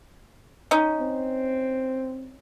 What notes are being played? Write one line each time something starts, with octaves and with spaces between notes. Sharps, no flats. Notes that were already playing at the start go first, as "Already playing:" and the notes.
C#4 D#4
C4